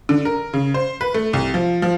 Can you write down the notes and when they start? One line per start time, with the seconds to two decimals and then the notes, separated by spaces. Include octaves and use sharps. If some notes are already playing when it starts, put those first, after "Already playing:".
0.09 D3
0.25 A#4
0.53 C#3
0.74 C5
1.01 B4
1.14 A3
1.33 C2
1.54 F3
1.82 F3